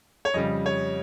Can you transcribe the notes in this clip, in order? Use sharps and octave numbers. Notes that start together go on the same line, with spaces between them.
C#5
F2 C#3 G3 D#5
C#5